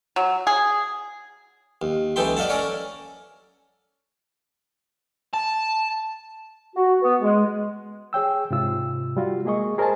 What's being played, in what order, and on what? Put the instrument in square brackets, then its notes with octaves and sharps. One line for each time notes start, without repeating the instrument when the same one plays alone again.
[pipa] F#3
G#4
[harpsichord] D#2
C#2 E3 D#4 A4 G5 C6
D5 D#5 F5 F#5 A5
C#4 A4 A#4 C#5 D5
[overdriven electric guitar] A5
[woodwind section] F#4
B3
G#3
[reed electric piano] G#4 C#5 G5 E6
G#2 C3 F4 E6
G3 F4 F#4
G#3 A#3 G#4 D#5 C#6
G#4 A#4 C5 D#5 G#5 A5